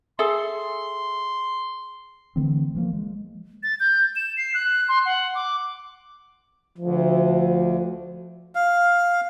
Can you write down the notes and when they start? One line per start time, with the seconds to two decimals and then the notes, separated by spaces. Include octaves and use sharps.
0.19 G#4 A4 E5 C6
2.36 D3 E3 A3 C4
2.75 E3 F3 A#3
2.93 G#3
3.63 A6
3.80 G6
4.16 E7
4.37 C7
4.54 F#6
4.88 C6
5.05 F#5
5.35 D6
6.78 D2 F3
8.55 F5